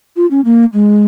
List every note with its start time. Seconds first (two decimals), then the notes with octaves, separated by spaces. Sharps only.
0.16 F4
0.31 C#4
0.45 A#3
0.74 G#3